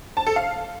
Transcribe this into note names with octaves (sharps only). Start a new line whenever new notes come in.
A5
A4
F5